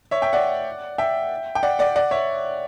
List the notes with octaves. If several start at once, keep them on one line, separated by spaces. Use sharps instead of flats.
C#5 E5
E5 G5
D5 F#5
E5 G5
G5
D5 F#5
D5 F#5
D5 F#5
C#5 E5